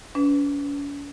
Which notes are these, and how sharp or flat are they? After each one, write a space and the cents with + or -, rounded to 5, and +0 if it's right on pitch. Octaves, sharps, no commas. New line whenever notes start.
C#4 +45 B4 +20